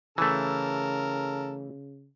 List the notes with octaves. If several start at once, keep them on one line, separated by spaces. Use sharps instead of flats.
C#3 E3 A3 A4 A#4